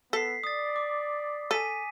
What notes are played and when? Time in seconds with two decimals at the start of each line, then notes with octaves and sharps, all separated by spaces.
0.13 B3 A4 B6 C7
0.44 D5 D#6 A6
0.76 D6
1.51 A4 G#5 B6 D#7